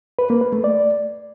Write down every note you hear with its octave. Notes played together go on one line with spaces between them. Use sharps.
B4
A#3
B4
A3
D5